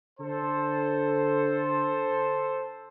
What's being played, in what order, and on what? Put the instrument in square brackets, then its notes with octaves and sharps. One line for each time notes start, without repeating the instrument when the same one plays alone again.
[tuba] D3 [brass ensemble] A4 C5